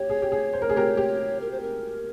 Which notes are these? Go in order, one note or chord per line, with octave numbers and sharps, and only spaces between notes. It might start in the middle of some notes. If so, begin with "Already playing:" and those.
Already playing: G4 C#5
G#4
G4
G#4
C5
A#4
G#4
G4 A#4
G4
A#4
C5
A#4